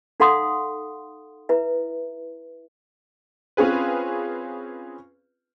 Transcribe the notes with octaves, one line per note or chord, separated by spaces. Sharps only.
D#4 A4 F5 F#5 C6 D#6
E4 B4 E5
C4 C#4 F4 G#4 B4